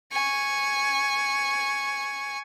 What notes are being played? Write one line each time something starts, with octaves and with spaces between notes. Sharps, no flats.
G#5 C#6